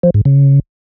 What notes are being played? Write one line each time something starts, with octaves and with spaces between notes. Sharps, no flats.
F3
G#2
C#3